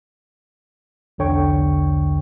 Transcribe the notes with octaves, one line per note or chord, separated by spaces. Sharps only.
B1 E2 D3 C#5 G5 C#6